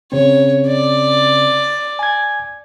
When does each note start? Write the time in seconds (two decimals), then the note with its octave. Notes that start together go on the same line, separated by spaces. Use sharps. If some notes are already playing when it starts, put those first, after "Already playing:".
0.12 C#3 C4 C#5
0.67 D5
1.99 G#5 G#6